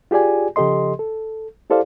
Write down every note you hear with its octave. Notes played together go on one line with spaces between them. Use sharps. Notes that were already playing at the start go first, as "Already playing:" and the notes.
F4 G4 G#4 D5 G#5
C#3 F3 G4 A4 D#5 C6
A4
E4 G4 A4 C5 D5 F5